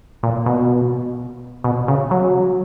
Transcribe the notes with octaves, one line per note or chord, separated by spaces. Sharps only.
A#2
B2
B2
C#3
F#3